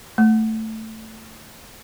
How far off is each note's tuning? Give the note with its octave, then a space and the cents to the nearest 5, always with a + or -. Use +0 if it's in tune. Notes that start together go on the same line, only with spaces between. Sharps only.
A3 +5